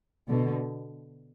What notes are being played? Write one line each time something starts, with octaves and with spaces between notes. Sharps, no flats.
B2 D3